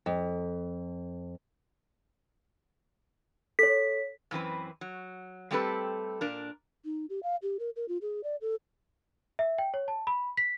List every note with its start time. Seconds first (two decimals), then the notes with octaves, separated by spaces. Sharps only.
0.06 F2
3.59 A4 C#5 B6
4.31 F#2 E3 C4 B4
4.81 F#3
5.51 G3 A3 C4 G4 A4 B4
6.21 A#2 D4 A#4
6.85 D#4
7.10 G4
7.23 F5
7.43 G4
7.59 A#4
7.76 A#4
7.88 F4
8.02 G#4
8.24 D5
8.41 A4
9.39 E5
9.58 G5
9.74 C#5
9.88 A5
10.07 B5
10.37 B6